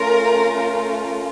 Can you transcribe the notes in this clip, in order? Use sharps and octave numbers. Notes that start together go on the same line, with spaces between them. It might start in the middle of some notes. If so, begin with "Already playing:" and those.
Already playing: A3 C#4 F4 A#4